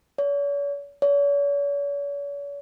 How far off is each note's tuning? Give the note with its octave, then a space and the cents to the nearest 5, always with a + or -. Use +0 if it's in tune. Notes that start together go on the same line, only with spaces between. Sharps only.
C#5 +45
C#5 +45